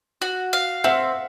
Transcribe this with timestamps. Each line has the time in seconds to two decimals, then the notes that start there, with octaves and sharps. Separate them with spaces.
0.22 F#4
0.53 F5
0.84 C4 E5 F#5